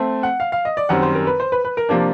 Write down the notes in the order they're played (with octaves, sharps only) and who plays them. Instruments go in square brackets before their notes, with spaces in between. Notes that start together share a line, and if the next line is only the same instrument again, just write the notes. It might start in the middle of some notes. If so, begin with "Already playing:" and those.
Already playing: [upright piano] A3 C4
F#5
F5
F5
D#5
D5
F#2 D#3 G3 C4 F#5
C5
A#4
B4
C5
B4
B4
A#4
C3 F3 A#3 D4